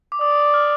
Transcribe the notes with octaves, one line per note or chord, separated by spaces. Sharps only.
D6
D5 D#6
D#6
D#6
F6